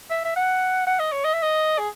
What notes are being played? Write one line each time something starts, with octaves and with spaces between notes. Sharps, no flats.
E5
E5
F#5
F#5
D#5
C#5
D#5
E5
D#5
G#4